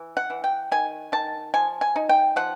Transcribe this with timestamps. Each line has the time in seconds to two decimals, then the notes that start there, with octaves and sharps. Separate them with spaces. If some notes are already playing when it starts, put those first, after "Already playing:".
Already playing: E3
0.17 F#5
0.30 E3
0.44 G5
0.71 D#3 G#5
1.12 D#3 A5
1.54 F3 G#5
1.81 G#5
1.96 D#4
2.09 G5
2.36 F3 F#5